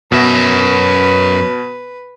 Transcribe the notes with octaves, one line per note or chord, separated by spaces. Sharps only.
F#2 B2 B4 E5